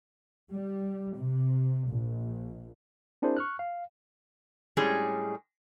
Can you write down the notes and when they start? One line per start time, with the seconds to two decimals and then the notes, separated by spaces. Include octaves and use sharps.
0.53 G3
1.17 C3
1.89 A#1
3.22 C4 D4 E4 G#4 A#4 C5
3.37 C#6 F6 F#6
3.59 F5
4.77 A2 G3 G#3 C#4 D4 G#4